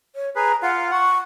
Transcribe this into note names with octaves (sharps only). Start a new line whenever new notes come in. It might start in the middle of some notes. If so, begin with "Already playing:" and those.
C#5
G#4 B4 A#5
F4 F5 F#5
F#5 C#6